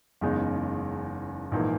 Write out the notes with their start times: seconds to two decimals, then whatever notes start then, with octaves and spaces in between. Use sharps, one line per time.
0.21 F#1 E2 C#3 G#3 D#4
1.52 A#1 G#2 E3 A#3